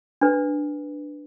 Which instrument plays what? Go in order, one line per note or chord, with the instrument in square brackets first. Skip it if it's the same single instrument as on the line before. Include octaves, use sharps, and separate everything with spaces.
[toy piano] D4 B4